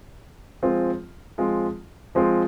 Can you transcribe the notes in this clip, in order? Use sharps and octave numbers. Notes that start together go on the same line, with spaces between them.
F3 G#3 C4 F4
F3 G#3 C4 F4
F3 G#3 C4 F4